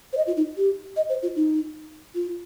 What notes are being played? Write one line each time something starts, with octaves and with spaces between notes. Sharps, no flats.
C5
D#5
F4
D#4
G4
D#5
C5
F4
D#4
F4